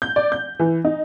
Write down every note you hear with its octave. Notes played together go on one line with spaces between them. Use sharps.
G6
D5
G6
E3
D#4